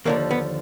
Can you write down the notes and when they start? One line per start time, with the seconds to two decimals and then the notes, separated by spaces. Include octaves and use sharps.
0.05 D#2 D3 F3 A#3
0.31 B3